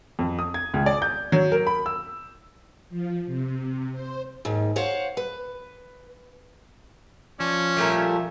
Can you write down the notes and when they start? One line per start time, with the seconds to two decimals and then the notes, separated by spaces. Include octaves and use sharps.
0.19 F2
0.39 D#6
0.54 G#6
0.74 C#2
0.86 D5
1.02 G6
1.32 F#3
1.52 A#4
1.67 B5
1.86 E6
2.90 F3
3.26 C3
3.92 C5
4.45 D#2 G#2
4.76 C5 C#5 F5 F#5
5.17 B4
7.40 F3 C#4 D5
7.77 A#2 G3 A3 F4 E5